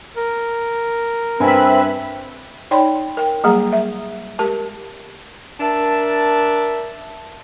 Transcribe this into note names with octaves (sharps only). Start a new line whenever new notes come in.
A#4
G2 C4 B4 E5 G#5 B5
D#4 C#5 D5 G5 B5 C6
A#4 G5
F#3 G3 A#3 G#4 A#5
E5
G#3 G4 A#4 A5
D4 A#4 E5 A5